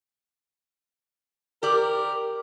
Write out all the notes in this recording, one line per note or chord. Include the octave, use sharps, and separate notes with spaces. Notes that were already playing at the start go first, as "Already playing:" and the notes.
G4 A#4 D5